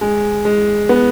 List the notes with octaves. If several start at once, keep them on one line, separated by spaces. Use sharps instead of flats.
G#3
G#3
B3